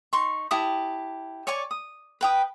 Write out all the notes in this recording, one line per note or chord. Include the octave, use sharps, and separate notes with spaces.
D#4 C6 C#6
E4 G4 A5 D#6
C#5 D5 G#5 C#6
D#6
B4 G5 D#6